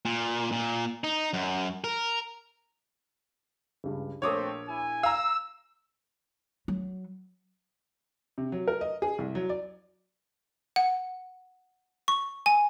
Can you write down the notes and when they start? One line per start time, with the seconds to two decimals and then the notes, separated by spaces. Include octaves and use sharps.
0.05 A#2
0.52 A#2
1.04 D#4
1.33 F#2
1.84 A#4
3.84 C#2 G2
4.22 A#1 A3 C4 A#4 C#5 D6 D#6
4.68 E4 G#5
5.03 F5 A#5 E6
6.68 F#3
8.38 C3
8.52 F#3
8.68 A#4
8.81 D#5
9.02 G#4
9.18 C2
9.35 F#3
9.49 D5
10.76 F#5
12.08 C#6
12.46 G#5